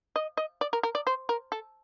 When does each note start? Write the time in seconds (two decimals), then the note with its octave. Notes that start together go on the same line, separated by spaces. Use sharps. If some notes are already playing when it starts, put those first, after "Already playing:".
0.16 D#5
0.37 D#5
0.61 D5
0.73 A#4
0.83 A#4
0.95 D5
1.07 C5
1.29 A#4
1.52 A4